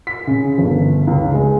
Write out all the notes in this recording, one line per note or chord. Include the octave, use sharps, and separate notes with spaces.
B6
C#3
G1
C#2
G#3